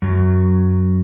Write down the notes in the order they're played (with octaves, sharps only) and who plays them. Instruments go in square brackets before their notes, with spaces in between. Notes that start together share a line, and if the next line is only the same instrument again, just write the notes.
[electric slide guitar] F#2 F#3